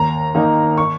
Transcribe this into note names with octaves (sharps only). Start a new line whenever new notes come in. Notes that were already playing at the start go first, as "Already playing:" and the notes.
Already playing: D#2 A#5
D#3 A#3 D#4
C#6